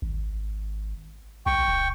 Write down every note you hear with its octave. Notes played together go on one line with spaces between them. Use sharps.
G#1
B1 G5 C#6
D1